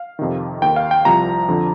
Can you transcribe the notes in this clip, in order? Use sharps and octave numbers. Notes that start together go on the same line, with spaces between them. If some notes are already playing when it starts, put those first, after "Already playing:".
Already playing: F5
F2 C3 D#3
D#2 D#3 G5
F5
G5
C2 C3 F3 A#5
F2 D3 F3